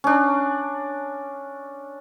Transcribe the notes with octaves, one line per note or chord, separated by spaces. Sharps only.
C#4 D4